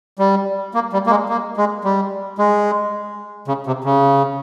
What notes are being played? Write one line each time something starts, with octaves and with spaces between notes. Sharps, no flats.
G3
A#3
G3
A#3
G#3
A#3
G#3
G3
G#3
C#3
C3
C#3